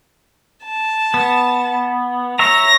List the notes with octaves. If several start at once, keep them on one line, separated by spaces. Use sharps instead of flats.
A5
B3
C#5 E5 A#5 A#6